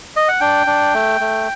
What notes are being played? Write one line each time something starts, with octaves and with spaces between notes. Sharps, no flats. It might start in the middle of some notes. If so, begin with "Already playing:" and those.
D#5
F#5
D4 G5
D4
A3
A3